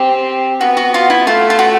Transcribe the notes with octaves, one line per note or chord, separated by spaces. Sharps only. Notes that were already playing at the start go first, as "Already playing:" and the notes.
Already playing: C4 G4
B3 F#4
F#4
F4
E4
A3 F4
F4
F#4